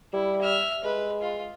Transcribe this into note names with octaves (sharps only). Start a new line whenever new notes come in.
G3 E4
E5 F6
G#3 B4
F4